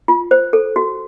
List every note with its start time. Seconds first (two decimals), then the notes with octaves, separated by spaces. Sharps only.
0.08 F4
0.31 C5
0.53 A4
0.76 F#4